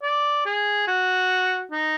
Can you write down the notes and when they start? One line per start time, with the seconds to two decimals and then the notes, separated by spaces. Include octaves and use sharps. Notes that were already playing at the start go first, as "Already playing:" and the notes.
0.03 D5
0.46 G#4
0.87 F#4
1.72 D#4